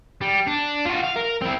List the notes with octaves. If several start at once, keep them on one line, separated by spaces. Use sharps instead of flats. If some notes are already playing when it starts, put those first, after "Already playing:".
G3
D4
F4 F#4
F5
A#4
C4 E4